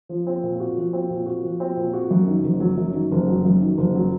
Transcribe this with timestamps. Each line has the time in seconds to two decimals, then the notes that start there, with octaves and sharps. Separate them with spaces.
0.09 F3
0.27 C4
0.43 A#2
0.60 F#4
0.77 F3
0.93 C4
1.10 A#2
1.26 F#4
1.44 F3
1.60 C4
1.77 A#2
1.93 F#4
2.11 F#2
2.28 D#3
2.44 F#1
2.60 F#3
2.77 F#2
2.94 D#3
3.12 F#1
3.28 F#3
3.45 F#2
3.61 D#3
3.78 F#1
3.95 F#3